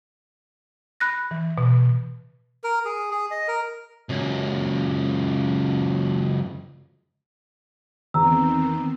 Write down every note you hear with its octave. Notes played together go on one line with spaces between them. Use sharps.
B5 F#6 A#6
E3
B2
A#4
G#4
G#4
D#5
A#4
C#2 F#2
E2 D#3 B3 C4 A#5 E6